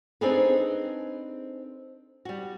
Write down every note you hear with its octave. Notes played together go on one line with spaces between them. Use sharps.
C4 D4 D#4 G#4 A4 B4
G3 F#4